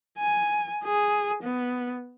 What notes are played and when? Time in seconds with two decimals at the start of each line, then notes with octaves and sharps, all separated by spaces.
0.18 G#5
0.84 G#4
1.43 B3